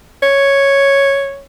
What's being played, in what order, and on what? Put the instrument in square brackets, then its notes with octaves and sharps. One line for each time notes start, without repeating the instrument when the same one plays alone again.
[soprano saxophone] C#5